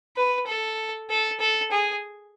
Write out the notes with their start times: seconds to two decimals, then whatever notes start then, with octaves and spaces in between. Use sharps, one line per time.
0.17 B4
0.47 A4
1.10 A4
1.40 A4
1.72 G#4